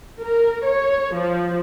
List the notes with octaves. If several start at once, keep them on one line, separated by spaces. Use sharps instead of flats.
A#4
C#5
F3